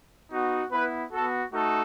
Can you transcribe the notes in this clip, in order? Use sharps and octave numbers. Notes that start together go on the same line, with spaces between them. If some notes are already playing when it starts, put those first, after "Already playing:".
B3 D#4 F#4
B3 E4 B4
B3 F#4 A4
A3 D#4 F#4 A4